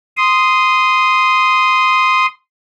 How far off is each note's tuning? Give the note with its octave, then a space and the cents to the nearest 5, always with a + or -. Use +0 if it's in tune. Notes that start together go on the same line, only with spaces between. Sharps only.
C6 -10 D#6 +0